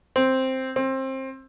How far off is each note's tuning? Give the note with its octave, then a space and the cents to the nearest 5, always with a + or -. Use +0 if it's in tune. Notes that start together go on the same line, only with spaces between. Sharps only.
C4 +5
C4 +25